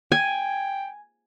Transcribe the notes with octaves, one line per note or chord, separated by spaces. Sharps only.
G5 G#5